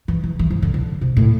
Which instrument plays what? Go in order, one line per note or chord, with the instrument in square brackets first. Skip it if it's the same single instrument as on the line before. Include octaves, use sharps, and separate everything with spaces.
[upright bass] E3
E3
E3
F3
D3
D3
C3
A2